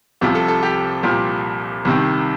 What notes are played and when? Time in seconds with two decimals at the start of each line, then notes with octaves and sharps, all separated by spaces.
0.21 C2 C3 F3 G4
0.35 A4
0.48 A4
0.63 G4
1.03 C2 A#2 F3 G4
1.85 C2 C3 D#3